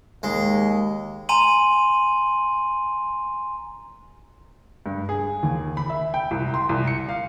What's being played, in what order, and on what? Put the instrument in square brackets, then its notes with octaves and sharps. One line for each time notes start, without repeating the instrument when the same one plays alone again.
[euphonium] D#2 [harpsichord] G#3
[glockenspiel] G#5 A#5 C6 D#7 F#7
[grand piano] G2
G#4
D#2
B5
E5
G5
C2
C6
C2
C#7
F5